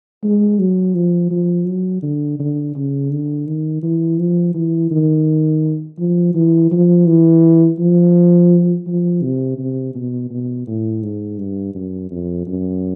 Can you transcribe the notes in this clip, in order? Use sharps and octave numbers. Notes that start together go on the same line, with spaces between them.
G#3
F#3
F3
F3
F#3
D3
D3
C#3
D3
D#3
E3
F3
E3
D#3
F3
E3
F3
E3
F3
F3
C3
C3
B2
B2
A2
G#2
G2
F#2
F2
F#2